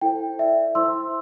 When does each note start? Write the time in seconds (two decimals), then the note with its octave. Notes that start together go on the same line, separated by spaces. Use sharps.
0.02 E4 A4 C5 G5
0.39 E4 A4 D5 E5
0.75 E4 C5 C6 E6